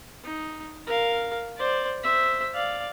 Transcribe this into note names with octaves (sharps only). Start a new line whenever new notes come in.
D#4
A#4 F5
C5 D5
C5 E5
D5 F5